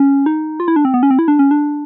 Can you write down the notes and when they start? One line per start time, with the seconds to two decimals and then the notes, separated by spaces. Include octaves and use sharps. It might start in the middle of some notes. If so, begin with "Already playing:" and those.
Already playing: C#4
0.26 D#4
0.60 F4
0.68 E4
0.76 D4
0.85 C4
0.94 B3
1.03 C#4
1.11 C4
1.19 E4
1.28 D4
1.39 C#4
1.51 D4